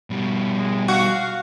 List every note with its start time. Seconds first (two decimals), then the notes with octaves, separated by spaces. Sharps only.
0.10 B2 G3
0.56 G#3
0.88 F#4 F5